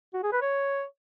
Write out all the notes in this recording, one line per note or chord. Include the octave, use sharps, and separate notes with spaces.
F#4
G#4
B4
C#5